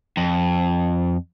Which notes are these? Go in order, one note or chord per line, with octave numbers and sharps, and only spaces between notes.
F2